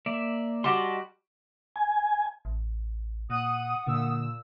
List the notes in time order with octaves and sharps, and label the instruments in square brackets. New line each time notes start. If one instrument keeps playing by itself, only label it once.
[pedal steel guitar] A#3 D5 E5
[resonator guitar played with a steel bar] G3 F#4 [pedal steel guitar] D#5 A5 C6
[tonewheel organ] G#5
[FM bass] A1
[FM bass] A#2 [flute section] F#5 D#6 [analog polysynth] F#6 D#7
[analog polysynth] A#2 E6 [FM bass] D3